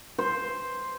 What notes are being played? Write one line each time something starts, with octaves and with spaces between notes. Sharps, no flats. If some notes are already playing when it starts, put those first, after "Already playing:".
C5